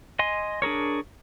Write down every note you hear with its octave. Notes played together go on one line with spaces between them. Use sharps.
D#5 G#5 C6
D4 G#4 A#4 C#5